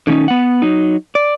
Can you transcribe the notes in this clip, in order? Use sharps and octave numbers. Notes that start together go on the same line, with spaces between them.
D3 D#3 A3 C#4 D#4
B3 F#5
F#3 D#4
D5